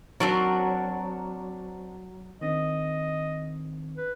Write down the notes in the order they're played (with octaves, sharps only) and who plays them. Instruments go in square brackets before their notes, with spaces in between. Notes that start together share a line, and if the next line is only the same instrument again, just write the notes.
[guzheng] F#3 [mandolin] C4 D4 A#4
[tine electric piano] D#3 C4 D4 [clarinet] D#5
[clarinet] B4